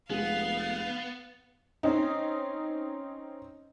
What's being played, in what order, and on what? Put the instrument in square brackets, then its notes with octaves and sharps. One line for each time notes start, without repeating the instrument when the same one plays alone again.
[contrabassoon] F1 [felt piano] G#3 [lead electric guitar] B3 [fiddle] F5
[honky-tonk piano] C4 C#4 D#4